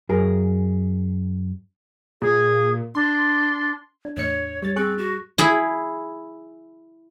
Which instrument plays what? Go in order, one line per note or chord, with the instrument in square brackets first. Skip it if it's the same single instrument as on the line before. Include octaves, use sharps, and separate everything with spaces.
[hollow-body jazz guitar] F#2 G#4 A#4
[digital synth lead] A#2 [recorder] G#4
[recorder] D4 [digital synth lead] C6
[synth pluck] D4
[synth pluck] E2 A2 C#7 [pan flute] C#5
[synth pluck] G3 A6 [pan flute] C#5
[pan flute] C4 [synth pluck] G#4 C#6 F#6
[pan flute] F#4
[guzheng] E4 G#4 B5